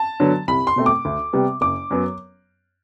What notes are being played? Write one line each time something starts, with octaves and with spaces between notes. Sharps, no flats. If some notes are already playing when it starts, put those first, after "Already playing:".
Already playing: A5
D3 F#3 B3
C2 B5
C6
B2 A3 C4
D6
D2
C3 G3 B3
F#1 D6
F#2 F#3 B3